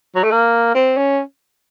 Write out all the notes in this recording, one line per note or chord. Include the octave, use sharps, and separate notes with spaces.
F#3
A3
A#3
C4
C#4